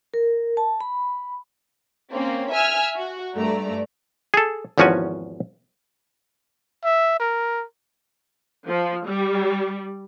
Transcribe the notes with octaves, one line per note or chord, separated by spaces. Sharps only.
A#4
A5
B5
A#3 C4 C#4
E5 G#5 E6 F6
F#4
G2 A3 D5 A#5
G#4 A4
G#1 E2 F3 C#4 F#4 G#5
E5
A#4
F3
G3